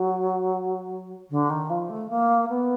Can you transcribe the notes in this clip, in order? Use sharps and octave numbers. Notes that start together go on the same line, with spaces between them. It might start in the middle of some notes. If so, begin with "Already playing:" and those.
Already playing: F#3
D3
D#3
F3
A3
A#3
B3